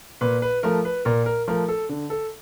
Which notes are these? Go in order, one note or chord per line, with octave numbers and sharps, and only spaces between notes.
A#2 B4
B4
F3 A3 A#4
B4
A#2 A#4
A#4
F3 A3 A#4
A4
D3
A4